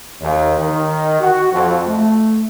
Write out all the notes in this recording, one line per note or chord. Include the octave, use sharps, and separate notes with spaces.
D#2
D#3
F#4
F2
A3